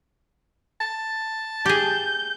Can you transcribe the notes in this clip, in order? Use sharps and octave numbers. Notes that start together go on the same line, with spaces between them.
A5
G4 G#4 G6